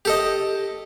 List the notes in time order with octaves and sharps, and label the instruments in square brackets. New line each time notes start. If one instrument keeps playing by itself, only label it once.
[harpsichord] G4 A4 D#5